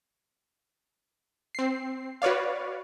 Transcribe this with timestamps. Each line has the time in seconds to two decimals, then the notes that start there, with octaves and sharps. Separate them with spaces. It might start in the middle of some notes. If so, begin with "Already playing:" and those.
1.55 C4 C7
2.22 F#4 B4 C#5 D5 F5